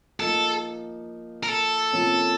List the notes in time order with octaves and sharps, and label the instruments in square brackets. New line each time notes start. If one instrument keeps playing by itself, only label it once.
[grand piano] F3 A#3 D#4 [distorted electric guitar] A4
[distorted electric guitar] A#4
A4
[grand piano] C3 F3 A#3 C#4